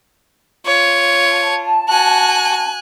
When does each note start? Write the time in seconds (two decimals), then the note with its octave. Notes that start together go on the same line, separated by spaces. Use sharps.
0.66 F4 C#5
1.31 A5
1.89 F#4 G#5 F#6